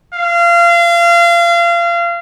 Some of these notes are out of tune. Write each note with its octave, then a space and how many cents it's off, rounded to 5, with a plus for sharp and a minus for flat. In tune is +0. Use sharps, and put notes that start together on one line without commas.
F5 -30